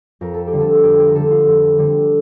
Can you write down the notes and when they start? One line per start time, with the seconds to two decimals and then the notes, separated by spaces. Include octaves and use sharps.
0.21 F2 A#4
0.34 A4
0.47 G4
0.53 D3 G3 C4
0.61 A4
0.84 F2 G4
1.00 G4
1.08 A#4
1.15 D3 G3 C4 A4
1.31 F4
1.47 F2
1.78 D3 G3 C4